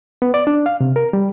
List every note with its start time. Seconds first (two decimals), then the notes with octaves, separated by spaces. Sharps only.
0.22 B3
0.34 D5
0.47 D4
0.66 F5
0.80 C3
0.96 A#4
1.13 G3